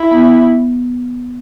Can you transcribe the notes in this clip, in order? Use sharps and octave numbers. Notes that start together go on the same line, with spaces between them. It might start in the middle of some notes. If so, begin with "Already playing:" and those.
Already playing: E4
B3